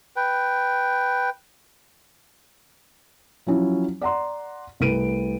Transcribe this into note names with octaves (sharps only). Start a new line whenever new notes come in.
B4 G5
F3 F#3 C#4 E4
D5 F#5 A#5 C6
C2 A3 B4 D7 D#7